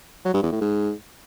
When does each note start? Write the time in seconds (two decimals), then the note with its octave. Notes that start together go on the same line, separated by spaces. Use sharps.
0.25 F#3
0.34 G2
0.43 E2
0.52 A2
0.61 G#2